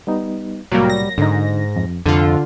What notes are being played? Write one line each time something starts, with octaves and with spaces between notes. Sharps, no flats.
G3 B3 D#4
C2 A2 F#3 G3 A#3
A#6
G#2 D3 D#4
F2
C2 F2 D3 F4